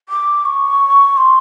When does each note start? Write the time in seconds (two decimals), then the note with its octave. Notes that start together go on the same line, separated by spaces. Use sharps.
0.09 D6
0.45 C#6
1.17 C6